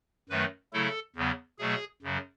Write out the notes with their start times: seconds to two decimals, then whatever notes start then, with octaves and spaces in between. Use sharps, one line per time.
0.29 F#2 D#3 F#3 A3 B4
0.73 C#3 F#3 A3 E4 A4
1.16 E2 C#3 F#3 B3
1.59 B2 F#3 A3 G#4
2.03 F#2 C#3 F#3